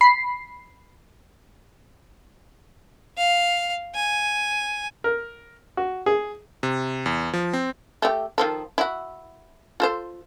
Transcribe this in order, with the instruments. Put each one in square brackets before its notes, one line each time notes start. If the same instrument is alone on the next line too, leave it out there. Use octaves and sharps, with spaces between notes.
[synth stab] B5 C7
[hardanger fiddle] F5
G#5
[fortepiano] A#4
F#4
G#4
[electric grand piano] C3
E2
F3
C4
[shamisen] A3 G4
D#3 F3 A4
E4 F#4
F4 A4 C5